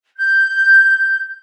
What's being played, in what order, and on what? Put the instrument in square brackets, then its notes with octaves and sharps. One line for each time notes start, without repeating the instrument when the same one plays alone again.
[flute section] G6